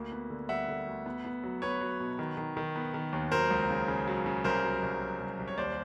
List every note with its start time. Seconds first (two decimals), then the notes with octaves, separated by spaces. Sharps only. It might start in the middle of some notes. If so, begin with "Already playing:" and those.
Already playing: D2 A#3
0.12 B3
0.30 D3
0.49 G3 E5 F#5
0.68 D3
0.87 D2
1.06 B3
1.25 B3
1.43 F#3
1.62 B3 B4 C#5
1.81 F#3
2.00 B2
2.19 D#3
2.37 D#3
2.57 D#3
2.76 B3
2.94 D#3
3.12 D#2
3.32 F#3 A#4 C5
3.51 C#2
3.70 C#3
3.88 C#3
4.07 F#3
4.26 C#3
4.44 C2 A#4 C5
4.64 F#3
4.82 C2
5.01 F#3
5.20 C2
5.39 C2
5.48 C#5
5.57 D#2 C5 D5